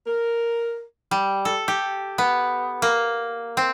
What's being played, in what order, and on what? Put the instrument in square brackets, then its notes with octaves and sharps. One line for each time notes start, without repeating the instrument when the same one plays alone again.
[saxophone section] A#4
[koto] G3
A4
G4
B3
A#3
C4